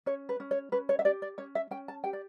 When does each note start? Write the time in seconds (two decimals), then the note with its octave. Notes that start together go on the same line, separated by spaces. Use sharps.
0.06 C#4 C#5
0.29 B4
0.40 C#4
0.51 C#5
0.72 C#4 B4
0.89 C#5
0.99 E5
1.05 G4 D5
1.22 D5
1.38 C#4 C#5
1.55 E5
1.71 C#4 G5
1.88 A5
2.04 G4 G5
2.13 D5